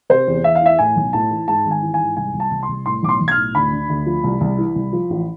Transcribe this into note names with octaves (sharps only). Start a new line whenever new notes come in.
C3 C5
E2
E2 E5
F5
E3 E5
A2 G#5
B1
A2 A5
E3
G#2 A5
G#1
G#5
E3
G#5
G#2
C2 G#5
C2
A5
C2
C6
C2
A2 C6
B1 D6
C6
B1
G#6
F6
A2
D2 B5
D3
D2
F3
C2
C2
E3
C2
F3
A1